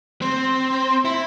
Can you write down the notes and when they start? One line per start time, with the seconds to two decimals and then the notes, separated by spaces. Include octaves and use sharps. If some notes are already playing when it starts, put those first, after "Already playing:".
0.22 C4
1.05 E4